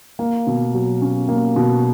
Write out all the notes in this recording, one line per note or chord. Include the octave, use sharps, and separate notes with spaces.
A#3
B2
F#3
C#4
A#3
B2